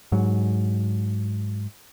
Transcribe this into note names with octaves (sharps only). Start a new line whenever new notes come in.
G#2 F#3